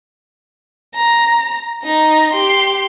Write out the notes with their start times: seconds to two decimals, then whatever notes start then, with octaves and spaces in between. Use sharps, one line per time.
0.94 A#5
1.82 D#4 A#5
2.33 G4 C6